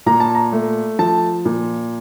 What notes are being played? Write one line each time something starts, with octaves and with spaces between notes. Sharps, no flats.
A#2 A#5
A5
A#5
A3
F3 A5
A#2